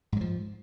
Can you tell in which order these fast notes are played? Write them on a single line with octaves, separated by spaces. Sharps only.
G#2 F#3 F3